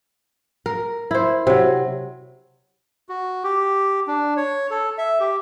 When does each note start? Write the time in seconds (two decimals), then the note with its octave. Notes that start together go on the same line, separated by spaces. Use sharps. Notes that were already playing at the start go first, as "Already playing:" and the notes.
0.66 A#4
1.11 E4 C5
1.47 C3 F#3
3.09 F#4
3.44 G4
4.07 D4
4.37 C#5
4.70 A4
4.98 E5
5.20 G4